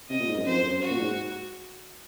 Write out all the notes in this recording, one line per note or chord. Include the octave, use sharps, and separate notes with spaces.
C3 D#5
A#2
G#2
F#2
F2 C5
F#2
F#2 F#4
A#2
G#2